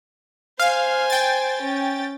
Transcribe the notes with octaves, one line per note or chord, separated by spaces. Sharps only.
C5 F5 G#5
G5 A6
C#4